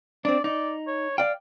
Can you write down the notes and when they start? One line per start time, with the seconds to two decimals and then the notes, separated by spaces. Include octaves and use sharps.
0.25 C4 D4 D5
0.44 D#4 D5
0.87 C#5
1.18 D5 F5 G5